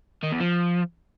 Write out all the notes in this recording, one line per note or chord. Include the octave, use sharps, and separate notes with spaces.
D#3
E2
F3